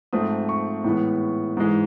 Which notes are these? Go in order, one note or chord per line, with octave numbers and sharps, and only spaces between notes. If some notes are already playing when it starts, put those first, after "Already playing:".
G#2 F3 A3 C4 D#6
C#6
A2 E3 G#3 B3
G#2 E3 G#3